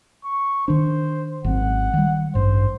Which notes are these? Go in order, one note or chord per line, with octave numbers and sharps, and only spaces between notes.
C#6
D#3 D4 C5
G#1 F#2 C4 F#5
D#3 G3
A1 G2 C5